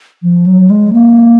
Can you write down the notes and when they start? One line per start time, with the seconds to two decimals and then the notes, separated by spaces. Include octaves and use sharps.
0.23 F3
0.46 F#3
0.70 G#3
0.93 A#3